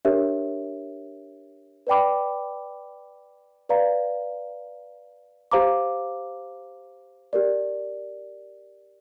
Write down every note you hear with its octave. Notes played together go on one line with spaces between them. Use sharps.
D4 G4 A#4 C#5 E5
B4 D5 G5 B5 D6
B4 D5 F5 A#5
G4 C5 F5 A#5 D6
G4 A#4 D5